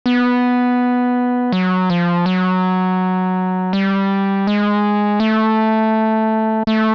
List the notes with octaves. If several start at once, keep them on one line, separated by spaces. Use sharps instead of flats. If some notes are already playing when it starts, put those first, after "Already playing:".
B3
F#3
F3
F#3
G3
G#3
A3
A3